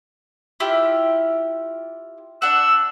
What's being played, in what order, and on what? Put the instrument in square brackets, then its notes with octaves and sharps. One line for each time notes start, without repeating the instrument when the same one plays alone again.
[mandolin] E4 F4 G4
[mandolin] D4 F#5 [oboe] E6